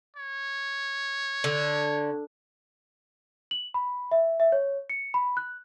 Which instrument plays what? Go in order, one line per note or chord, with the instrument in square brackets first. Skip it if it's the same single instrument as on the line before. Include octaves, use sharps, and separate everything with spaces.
[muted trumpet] C#5
[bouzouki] D3
[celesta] F#7
B5
E5
E5
C#5
C#7
B5
F#6